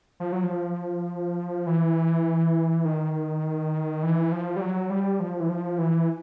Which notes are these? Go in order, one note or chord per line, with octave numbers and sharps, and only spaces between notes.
F3
F#3
F3
E3
D#3
E3
F3
G3
F#3
G3
F3
E3
F3
E3